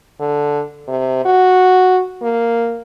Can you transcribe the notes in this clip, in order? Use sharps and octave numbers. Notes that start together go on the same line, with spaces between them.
D3
C3
F#4
A#3